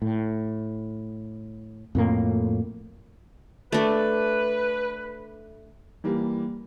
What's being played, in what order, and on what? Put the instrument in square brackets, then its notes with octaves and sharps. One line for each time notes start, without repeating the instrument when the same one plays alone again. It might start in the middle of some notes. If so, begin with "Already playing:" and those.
[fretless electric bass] A2
F2 A2 A#3
[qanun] A3 D4 [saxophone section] B4
[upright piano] E3 G3 A#3